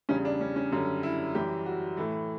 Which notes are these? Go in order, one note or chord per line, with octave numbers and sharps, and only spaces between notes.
E2 C#3 G3 C#4
D4
C#4
C#4
F#2 D3 G3 C#4
E4
F#2 E3 G3 G4
F#4
A2 E3 A3